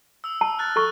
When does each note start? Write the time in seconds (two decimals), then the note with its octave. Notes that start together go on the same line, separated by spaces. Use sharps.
0.24 D#6 E6
0.41 A5
0.59 F6 F#6 A6
0.76 A4 C#6